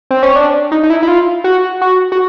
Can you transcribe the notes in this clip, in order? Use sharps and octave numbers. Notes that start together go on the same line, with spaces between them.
C4
C#4
D4
D#4
D#4
E4
E4
F4
F#4
F#4
F#4